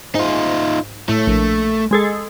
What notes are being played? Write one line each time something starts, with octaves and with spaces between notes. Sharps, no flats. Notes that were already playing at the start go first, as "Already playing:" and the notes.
G#2 D#4 F4
A2 A3
A#1
G#3 G#4 A4